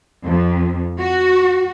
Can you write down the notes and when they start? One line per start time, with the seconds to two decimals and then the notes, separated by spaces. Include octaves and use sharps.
0.23 F2
0.99 F#4